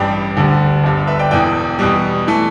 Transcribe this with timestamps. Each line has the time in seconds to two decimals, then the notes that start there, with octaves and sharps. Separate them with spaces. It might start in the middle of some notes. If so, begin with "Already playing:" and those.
Already playing: A1 G2 G3 D5 G5
0.37 D2 D3 G3
0.84 G1 G2 D3
1.07 B4 E5
1.19 D5 G5
1.31 E1 E2 E3 D5 G5
1.79 E2 B2 G3
2.27 E3 A3